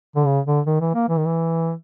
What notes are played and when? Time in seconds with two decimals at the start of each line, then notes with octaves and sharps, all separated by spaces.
0.15 D3
0.25 C#3
0.46 D3
0.67 D#3
0.81 E3
0.95 A#3
1.08 E3
1.17 D#3
1.26 E3